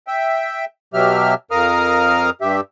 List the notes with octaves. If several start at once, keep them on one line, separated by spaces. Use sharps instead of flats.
E5 G5
B2 F#3 G4 E5 F6
F2 A#4 F5 A#5 D#6 F6
G2 G4 E5